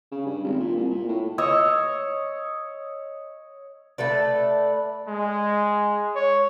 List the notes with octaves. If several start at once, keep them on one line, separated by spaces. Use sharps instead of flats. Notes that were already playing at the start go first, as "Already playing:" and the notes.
C#3
G2
G#1
A#2
C2
A#2
A2
C#5 D#5 C#6 E6
A3 A4 B4 D5
G#3
C#5